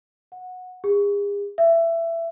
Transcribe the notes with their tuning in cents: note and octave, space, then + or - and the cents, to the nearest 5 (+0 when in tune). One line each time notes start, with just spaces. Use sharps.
F#5 -15
G#4 -40
E5 +20